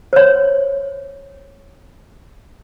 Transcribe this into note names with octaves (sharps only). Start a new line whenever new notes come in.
C5 C#5